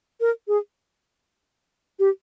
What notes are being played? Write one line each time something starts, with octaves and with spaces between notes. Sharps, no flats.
A#4
G#4
G4